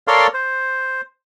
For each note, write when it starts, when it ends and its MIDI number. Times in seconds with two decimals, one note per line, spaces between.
0.08 0.27 69
0.08 0.27 70
0.08 0.27 73
0.08 0.27 74
0.08 0.27 77
0.08 0.27 84
0.34 1.01 72